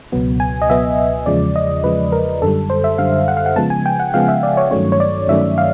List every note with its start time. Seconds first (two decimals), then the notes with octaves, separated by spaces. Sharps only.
0.12 C#2 B2 F#3 B3
0.40 G#5
0.62 D#5
0.69 C#2 B2 F#3 B3 E5
1.26 E2 C#3 F3 G#3 D5
1.56 D#5
1.84 E2 C#3 F3 G#3 B4
2.12 A#4
2.42 F#2 D3 G3 A4
2.70 C5
2.84 E5
2.98 F#2 D3 G3 F5
3.28 F#5
3.37 F5
3.46 F#5
3.56 C#3 F3 G#3 B3 A5
3.70 G#5
3.86 G5
4.00 F#5
4.14 C#3 F3 G#3 B3 F5
4.28 E5
4.43 D5
4.57 C#5
4.71 G2 D#3 F#3 A3 C#4 C#5
4.92 C#5
5.00 D5
5.28 G2 D#3 F#3 A3 C#4 E5
5.58 F5